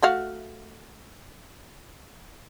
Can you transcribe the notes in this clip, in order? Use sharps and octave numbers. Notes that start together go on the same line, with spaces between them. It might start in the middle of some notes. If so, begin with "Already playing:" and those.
A3 F#4 F5